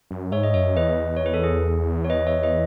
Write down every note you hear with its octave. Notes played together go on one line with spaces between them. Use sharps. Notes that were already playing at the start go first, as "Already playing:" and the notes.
F#2
G#2 C#5 E5
D#5
F#2 C#5 E5
E2 B4 D#5
C#5
B4
A4
G#4
C#5
B4 D#5
C#5 E5
B4 D#5